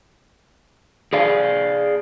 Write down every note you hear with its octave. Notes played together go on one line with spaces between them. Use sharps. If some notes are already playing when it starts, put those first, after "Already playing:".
G#4 D5 F5